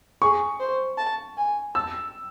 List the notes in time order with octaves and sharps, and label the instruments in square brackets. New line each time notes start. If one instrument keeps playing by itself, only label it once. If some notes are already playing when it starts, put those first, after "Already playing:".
[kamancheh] G#4 [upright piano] C#6
[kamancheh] C5
A5
G#5
[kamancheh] A5 [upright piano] E6